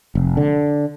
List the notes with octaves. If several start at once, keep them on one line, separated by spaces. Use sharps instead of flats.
F1
D3